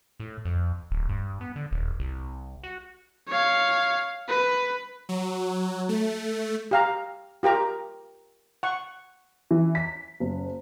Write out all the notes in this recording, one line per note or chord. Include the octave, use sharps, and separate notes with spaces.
A2
F2
D1
G2
B3
D3
D#1
C2
F#4
C#5 F5
B4
F#3
A3
G4 F5 A#5
F4 G4 A#4 A#5
F#5 C#6
E3
B6
F#1